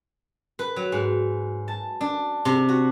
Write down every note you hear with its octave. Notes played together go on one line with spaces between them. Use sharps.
B4
F#3
G#2
A5
D4
C3
F#4